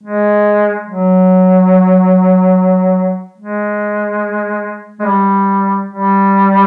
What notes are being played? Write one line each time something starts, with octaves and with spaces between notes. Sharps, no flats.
G#3
F#3
G#3
G#3
G3
G3